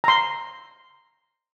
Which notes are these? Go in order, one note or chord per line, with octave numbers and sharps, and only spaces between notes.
A#5 C6